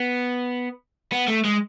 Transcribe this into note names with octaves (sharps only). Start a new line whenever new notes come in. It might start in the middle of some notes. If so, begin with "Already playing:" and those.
Already playing: B3
B3
A3
G#3